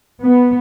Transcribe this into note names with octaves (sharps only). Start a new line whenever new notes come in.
B3